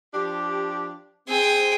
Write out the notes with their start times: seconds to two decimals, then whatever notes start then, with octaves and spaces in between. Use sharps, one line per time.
0.14 F3 D4 G4
1.28 C4 G#4 G5